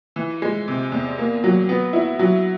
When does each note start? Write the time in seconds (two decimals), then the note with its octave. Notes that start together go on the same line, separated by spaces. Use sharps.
0.16 E3
0.42 G#3
0.68 C3
0.92 E2
1.18 A#3
1.44 F#3
1.69 B3
1.93 E4
2.19 F#3